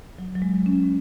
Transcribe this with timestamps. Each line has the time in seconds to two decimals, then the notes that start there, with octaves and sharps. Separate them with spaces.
0.19 F#3
0.35 F#3
0.42 G#3
0.66 C#4